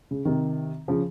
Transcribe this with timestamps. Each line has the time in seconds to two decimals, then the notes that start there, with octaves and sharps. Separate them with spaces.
0.11 C#3
0.25 C3 D#3
0.88 C#3 F3